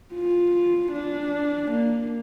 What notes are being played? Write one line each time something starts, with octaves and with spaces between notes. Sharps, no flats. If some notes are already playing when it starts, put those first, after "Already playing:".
F4
D4
A#3